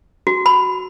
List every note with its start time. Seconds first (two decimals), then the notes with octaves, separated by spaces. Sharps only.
0.27 F#4
0.46 B5